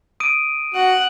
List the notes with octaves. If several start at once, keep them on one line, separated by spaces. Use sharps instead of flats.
D#6 D7 D#7
F#4 F#5